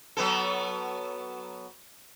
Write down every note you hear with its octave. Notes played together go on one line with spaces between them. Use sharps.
F#3 B3 A4